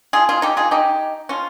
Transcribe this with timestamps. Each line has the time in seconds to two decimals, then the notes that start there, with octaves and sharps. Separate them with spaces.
0.13 F4 G#4
0.29 F4 G#4
0.42 D#4 G4
0.57 F4 G#4
0.71 D#4 G4
1.29 C#4 F4